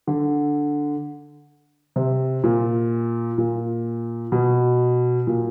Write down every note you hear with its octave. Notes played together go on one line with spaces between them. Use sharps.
D3
C3
A#2
A#2
B2
A#2